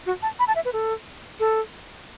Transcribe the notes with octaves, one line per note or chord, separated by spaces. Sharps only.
F#4
A5
B5
A5
E5
B4
A4
A4